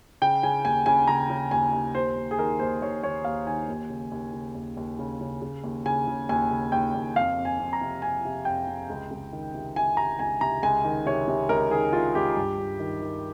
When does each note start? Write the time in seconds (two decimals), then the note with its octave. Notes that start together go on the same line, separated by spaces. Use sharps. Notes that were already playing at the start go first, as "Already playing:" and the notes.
0.22 C#3 G5
0.43 C#3 G#5
0.65 D#2 G#5
0.86 C#3 G#5
1.08 C#3 A#5
1.30 C#3
1.51 D#2 G#5
1.73 D#2
1.95 D#2 C5
2.16 D#2
2.31 G#4
2.38 D#3 A#4
2.59 D#2 C5
2.82 D#2 C#5
3.03 D#2 C#5
3.25 D#2 F5
3.47 D#3 G#5
3.69 D#2
3.90 C#3
4.12 D#2
4.33 C#3
4.55 D#2
4.77 D#2
4.99 C#3
5.21 C#3
5.42 C#3
5.64 D#2
5.86 C#3 G#5
6.08 C#3
6.29 D#2 G#5
6.50 C#3
6.72 D#2 G5
6.94 D#2
7.16 F2 F5
7.38 F2
7.45 G#5
7.59 F2
7.73 A#5
7.81 C3
8.02 F2 G#5
8.25 C3
8.45 F2 G5
8.67 C3
8.90 C#2
9.11 C#2
9.32 D#3
9.54 C3
9.76 C3 G#5
9.97 C3 A#5
10.19 C#2 G#5
10.41 C3 A#5
10.63 C#2 G#5
10.84 D#3
11.06 C3 C#5
11.28 C3
11.49 C#2 A#4
11.71 D#3 G#4
11.93 C3 F4
12.15 C#2 G4
12.36 G2
12.58 G2
12.79 D#3
13.01 D#3